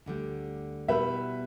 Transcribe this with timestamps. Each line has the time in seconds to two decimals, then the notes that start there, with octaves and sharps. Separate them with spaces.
0.06 D2 D3 G3 D4
0.88 B2 G3 B3 E4 B4 E5